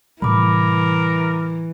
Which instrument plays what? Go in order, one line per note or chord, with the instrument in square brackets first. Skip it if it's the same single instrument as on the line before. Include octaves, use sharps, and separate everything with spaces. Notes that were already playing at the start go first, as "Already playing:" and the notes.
[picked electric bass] A2 C3 G3 [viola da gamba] E3 [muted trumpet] A#4 [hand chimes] B5 D6